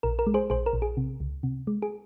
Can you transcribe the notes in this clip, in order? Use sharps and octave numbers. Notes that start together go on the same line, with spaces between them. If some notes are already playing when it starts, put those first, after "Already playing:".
A#1 A#4
A#4
G#3
G#4 C5
A#1 G#4 C5
A#4
A#1
G#4
C3
C#2
C3
G#3
G#4